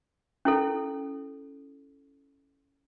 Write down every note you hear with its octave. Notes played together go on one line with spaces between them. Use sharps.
C#4 E4 A4